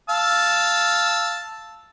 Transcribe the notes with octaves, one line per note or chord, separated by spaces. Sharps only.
F5 A5 E6